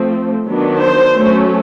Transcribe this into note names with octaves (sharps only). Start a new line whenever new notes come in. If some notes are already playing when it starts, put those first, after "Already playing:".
Already playing: F3 A3 C4
D#3 F#3 B3 D4
C5
F#3 A3 C#4